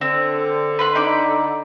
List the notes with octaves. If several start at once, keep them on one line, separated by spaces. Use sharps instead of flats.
D3 C4
B4 C6 F#6
D#4 B5 D6